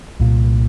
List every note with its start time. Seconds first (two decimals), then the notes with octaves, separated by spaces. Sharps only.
0.20 C2 A#2